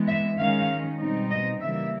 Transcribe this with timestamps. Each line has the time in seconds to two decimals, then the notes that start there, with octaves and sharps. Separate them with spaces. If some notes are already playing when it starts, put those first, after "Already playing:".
Already playing: E3 G#3 B3
0.08 E5
0.38 D#3 G#3 C#4 F5
0.99 B2 G3 C4 D#4
1.30 D#5
1.60 C#3 E3 G3 A#3 E5